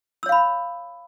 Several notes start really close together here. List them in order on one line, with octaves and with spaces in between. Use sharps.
E6 C#5 F5 B5